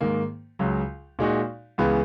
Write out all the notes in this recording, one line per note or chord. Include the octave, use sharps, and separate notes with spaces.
G#2 D#3 A#3
C#2 C#3 F#3
A#2 G#3 D#4 F#4
C#2 C#3 E3 B3